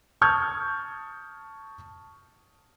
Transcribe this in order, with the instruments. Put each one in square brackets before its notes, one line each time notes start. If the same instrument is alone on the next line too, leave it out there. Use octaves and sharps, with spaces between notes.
[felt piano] A5 C#6 D#6 F6 G6 G#6